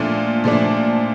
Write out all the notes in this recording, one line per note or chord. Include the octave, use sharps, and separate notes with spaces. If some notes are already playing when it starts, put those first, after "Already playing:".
Already playing: A#2 F3 A3 D4
A#2 F3 A3 D4